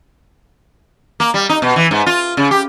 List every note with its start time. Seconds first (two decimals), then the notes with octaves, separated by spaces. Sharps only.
1.20 A#3
1.34 G3
1.49 D#4
1.62 B2
1.76 E3
1.91 G#2
2.06 F4
2.37 C#3
2.51 G4